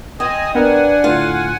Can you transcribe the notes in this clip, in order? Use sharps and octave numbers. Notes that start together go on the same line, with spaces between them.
C4 D#5 G#5 D#6
B3 D4 A#4 F#5 G#5
A2 D3 F4